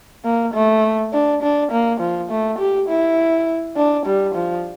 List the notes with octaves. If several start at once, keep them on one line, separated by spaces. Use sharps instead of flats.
A#3
A3
D4
D4
A#3
F3
A3
G4
E4
D4
G3
F3